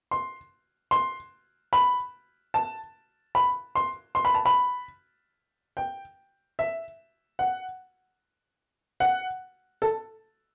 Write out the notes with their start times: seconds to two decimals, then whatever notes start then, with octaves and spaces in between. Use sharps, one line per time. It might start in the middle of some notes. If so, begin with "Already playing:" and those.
0.11 C6
0.91 C6
1.73 B5
2.54 A5
3.35 B5
3.75 C6
4.15 C6
4.25 B5
4.35 A5
4.46 B5
5.77 G5
6.59 E5
7.39 F#5
9.00 F#5
9.82 A4